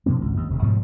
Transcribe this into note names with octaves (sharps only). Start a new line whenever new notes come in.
B2 F3 A#3 C4
G#1 C#2
D#2
D#1 C3
G#2 B2 F3 G3